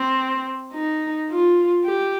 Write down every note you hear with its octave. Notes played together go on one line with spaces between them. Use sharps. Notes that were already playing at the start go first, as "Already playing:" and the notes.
Already playing: C4
D#4
F4
G4